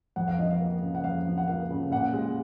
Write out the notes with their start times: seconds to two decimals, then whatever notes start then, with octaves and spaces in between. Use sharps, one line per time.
0.16 F2 F#5
0.28 F5
0.39 F3 D#5
0.51 F5
0.60 A#3
0.82 C#3
0.95 F#5
1.04 F2 F5
1.26 F3
1.38 F#5
1.48 A#3 F5
1.70 C#3
1.91 A#2 F#5
2.13 G#3